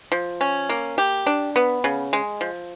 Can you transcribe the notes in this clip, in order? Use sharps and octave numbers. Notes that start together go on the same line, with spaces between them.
F3
C#4
A#3
G4
D4
B3
C#3
G#3
F3